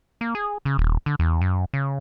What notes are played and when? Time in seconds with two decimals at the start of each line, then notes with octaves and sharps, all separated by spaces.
0.21 A#3
0.35 G#4
0.65 C#3
0.78 D#1
1.06 D3
1.19 E2
1.41 F#2
1.74 C#3